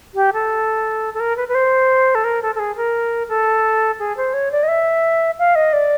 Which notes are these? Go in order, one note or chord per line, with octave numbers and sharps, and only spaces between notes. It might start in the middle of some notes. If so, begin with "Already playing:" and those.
G4
A4
A4
A#4
B4
B4
C5
A4
A#4
A4
A4
G#4
A#4
A4
G#4
C5
C#5
D5
D#5
E5
F5
D#5
D5